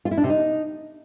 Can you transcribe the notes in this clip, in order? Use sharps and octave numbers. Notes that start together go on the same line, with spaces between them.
F4
E4
D4
C3
D#4